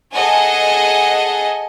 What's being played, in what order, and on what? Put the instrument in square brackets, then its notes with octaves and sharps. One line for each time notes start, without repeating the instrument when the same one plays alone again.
[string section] G#4 A4 D#5 F#5 G#5